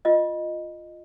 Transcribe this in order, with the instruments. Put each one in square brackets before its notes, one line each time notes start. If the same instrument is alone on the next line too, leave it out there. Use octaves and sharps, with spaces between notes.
[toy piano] F4 D#5